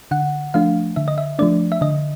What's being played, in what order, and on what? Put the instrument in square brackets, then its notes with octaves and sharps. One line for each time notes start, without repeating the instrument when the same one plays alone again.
[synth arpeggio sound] D3 F#5
F3 A3 D4 F5
D3 E5
D#5
E5
F3 A3 D4 D5
E5
D3 D#5